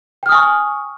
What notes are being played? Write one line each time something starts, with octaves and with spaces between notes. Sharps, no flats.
G5 G#5 C#6 D#6 F6